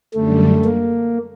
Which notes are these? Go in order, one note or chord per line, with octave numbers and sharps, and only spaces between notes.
F#2 D3 G3 A3
A#3